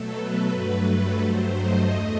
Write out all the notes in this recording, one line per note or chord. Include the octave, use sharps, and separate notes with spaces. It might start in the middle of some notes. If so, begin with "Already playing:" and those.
Already playing: B2 F#3 A3 A4
B4
G2 F#3 A3
A4
G2 F#3 A3 C5
D#5
E2 A3